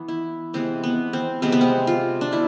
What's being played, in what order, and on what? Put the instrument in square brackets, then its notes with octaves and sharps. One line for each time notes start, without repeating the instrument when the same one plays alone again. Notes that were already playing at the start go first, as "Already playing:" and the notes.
Already playing: [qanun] E3 B3
E4
C3 E3 G#3 B3 C4
B3
C4
C3 G#3 B3 C4
B3
C4
F4
D4
B2 E4